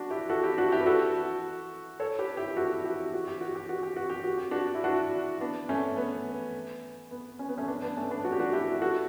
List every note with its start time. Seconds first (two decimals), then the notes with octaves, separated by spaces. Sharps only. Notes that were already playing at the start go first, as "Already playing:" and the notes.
Already playing: D4 F#4
0.10 E4 G4
0.29 F#4 A4
0.43 E4 G4
0.58 D4 F#4
0.72 E4 G4
0.81 B4
0.86 F#4 A4
2.00 A4 C#5
2.19 G4 B4
2.37 E4 G4
2.57 F#4 A4
2.85 E4 G4
3.14 F#4
3.28 G4
3.41 F#4
3.55 G4
3.69 F#4
3.83 G4
3.96 F#4
4.10 G4
4.24 F#4
4.38 G4
4.51 D4 F#4
4.75 E4
4.84 D4 F#4
5.41 B3 D4
5.69 A3 C#4
5.97 B3
7.11 B3
7.39 C#4
7.49 B3
7.58 A3 C#4
7.68 B3 D4
7.82 B3 D4
7.97 A3 C#4
8.10 B3 D4
8.25 F#4
8.32 G4
8.40 D4 F#4
8.53 E4 G4
8.81 F#4 A4